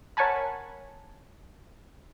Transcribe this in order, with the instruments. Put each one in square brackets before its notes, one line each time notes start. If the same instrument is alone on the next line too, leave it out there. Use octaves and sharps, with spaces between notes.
[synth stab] A#4 C#5 F#5 G#5 A5 B5